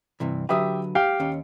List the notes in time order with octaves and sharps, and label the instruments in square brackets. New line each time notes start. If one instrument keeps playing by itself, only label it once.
[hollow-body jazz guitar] G2 C3 E3
[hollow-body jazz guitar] D3 F#3 B4 [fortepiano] G4 E5 D#6
[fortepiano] G4 F5 G5
[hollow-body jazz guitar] D#2 C#4